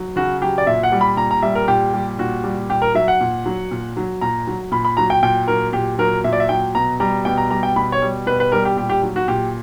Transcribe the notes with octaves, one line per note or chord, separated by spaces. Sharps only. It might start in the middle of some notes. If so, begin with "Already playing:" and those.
Already playing: F#3
C#3 F#4
F#3 G4
D5
A#2 E5
F#5
G3
B5
A#2 A#5
A#5
G3 E5
A#4
A#2 G4
G3
A#2 F#4
G3
A#2 G4
A#4
F#3 E5
F#5
A#2
F#3
A#2
F#3
A#2 A#5
F#3
A#2 B5
B5
F#3 A#5
G5
A#2 G5
F#3 A#4
A#2 G4
F#3 A#4
A#2 E5
D5
E5
F#3 G5
B2 A#5
G3 A#5
B2 G5
A#5
G3 A#5
G5
B2 B5
C#5
G3
B2 B4
B4
G3 A#4
G4
A#2 G4
G4
F#3
F#4
A#2 G4